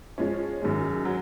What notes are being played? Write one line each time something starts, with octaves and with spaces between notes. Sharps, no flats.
F3 G#3 C#4
F#2 D#3 G#3
F#3